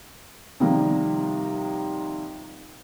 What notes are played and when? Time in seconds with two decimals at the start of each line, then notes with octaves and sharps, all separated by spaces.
0.60 C3 D#3 F3 G3 A#3